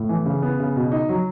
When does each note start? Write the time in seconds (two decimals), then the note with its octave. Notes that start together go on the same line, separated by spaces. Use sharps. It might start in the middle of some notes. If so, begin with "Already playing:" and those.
Already playing: A2
0.09 E3
0.25 C#3
0.42 B3
0.59 C#3
0.76 B2
0.92 D#4
1.09 F#3